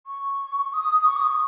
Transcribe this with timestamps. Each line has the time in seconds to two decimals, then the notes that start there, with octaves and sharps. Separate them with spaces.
0.07 C#6
0.74 D#6
1.06 C#6
1.16 D#6
1.27 C#6